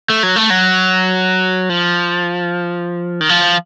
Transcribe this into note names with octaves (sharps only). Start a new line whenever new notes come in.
A3
F#3
A3
F#3
F3
D#3
F3